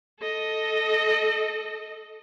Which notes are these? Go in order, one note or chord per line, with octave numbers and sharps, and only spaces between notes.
A4 D#5